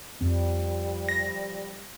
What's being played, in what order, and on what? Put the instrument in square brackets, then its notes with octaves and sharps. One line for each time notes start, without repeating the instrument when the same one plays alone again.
[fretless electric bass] F2 C4 [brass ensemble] F3 G3
[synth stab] A#6